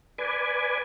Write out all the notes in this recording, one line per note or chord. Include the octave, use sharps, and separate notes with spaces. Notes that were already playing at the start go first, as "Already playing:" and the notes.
B4 D5 G#5